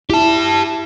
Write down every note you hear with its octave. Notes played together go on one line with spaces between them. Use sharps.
E4 G4 A5